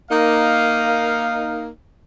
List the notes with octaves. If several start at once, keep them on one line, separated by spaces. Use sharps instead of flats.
A#3 D#4 F5